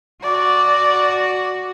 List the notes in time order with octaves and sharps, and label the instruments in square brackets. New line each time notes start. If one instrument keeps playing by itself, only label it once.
[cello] F#4 [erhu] D5